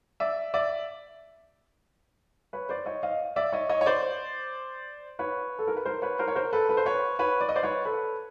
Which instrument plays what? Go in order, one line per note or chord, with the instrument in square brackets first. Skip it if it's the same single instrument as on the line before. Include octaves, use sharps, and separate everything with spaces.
[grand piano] D5 E5
D5 E5
B4 C#5
C5 D5
C#5 D#5
D#5 F5
D5 E5
C#5 D#5
C#5 D#5
C#5
C5 D5
B4 C#5
A4
A#4
B4
A#4 C5
B4 C#5
A#4 C5
C#5
A#4 C5
A4 B4
B4
C5
B4 C#5
B4 C#5
D5
D#5
C5 D5
B4 C#5
A4 B4